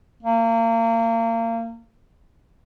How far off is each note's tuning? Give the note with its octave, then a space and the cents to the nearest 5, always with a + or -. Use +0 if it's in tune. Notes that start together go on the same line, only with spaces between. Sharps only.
A#3 -35